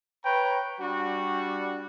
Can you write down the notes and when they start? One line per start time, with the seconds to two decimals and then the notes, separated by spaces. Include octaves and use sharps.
0.25 B4 C#5 G5 A#5
0.80 G3 D4 F#4